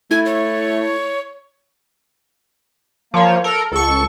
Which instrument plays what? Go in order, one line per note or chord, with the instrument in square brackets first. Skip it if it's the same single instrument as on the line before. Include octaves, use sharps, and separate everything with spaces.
[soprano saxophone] A3 [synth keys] E4 [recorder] G#6
[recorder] C#5
[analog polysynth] F3 C#5 [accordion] A#3
[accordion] A4 [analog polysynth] A#4
[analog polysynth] C#2 C#6 [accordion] A4